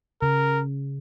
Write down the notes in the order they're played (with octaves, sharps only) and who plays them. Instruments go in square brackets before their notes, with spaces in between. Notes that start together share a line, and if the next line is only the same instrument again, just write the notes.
[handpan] C#3 [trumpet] A#4